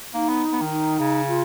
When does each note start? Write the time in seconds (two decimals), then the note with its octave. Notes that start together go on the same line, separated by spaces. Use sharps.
0.14 A#3 D#4
0.28 B3
0.52 B3
0.61 D#3
0.70 D#4
0.99 C#3
1.28 F4